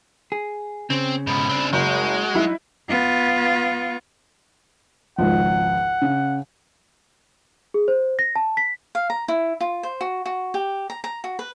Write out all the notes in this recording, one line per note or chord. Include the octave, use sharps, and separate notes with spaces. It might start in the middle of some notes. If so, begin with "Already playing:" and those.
G#4
C#3 C4
G#2 B2 B5
C4 D4
F#1 G#3 F#4 G6
F#3 D#4 E4
B3 F4
G#1 C#2 F3 F#5
C#3
G#4
C5
A#6
A5
B6
F5
A#5
E4
F4
C5
F#4
F#4
G4
A#5
A#5
F#4
B4